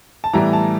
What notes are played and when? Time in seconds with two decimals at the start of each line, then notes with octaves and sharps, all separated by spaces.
0.24 A5
0.33 A2 E3 G3 B3 A#5
0.53 A5